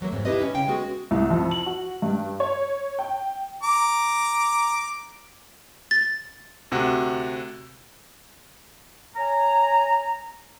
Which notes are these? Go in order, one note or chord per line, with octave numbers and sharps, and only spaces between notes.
E3 F#3 A3 A#3
F2 G#2 C4
D4 E4 F4 G4 B4 D#5
C#4
C#3 F5 G5
G#3 B3 C#4 F#4 G#4
C2
F2
F#7
F#4
G2
C#5
G5
A#5 D6
A6
D2 C3 F#4
C#5 G#5 A#5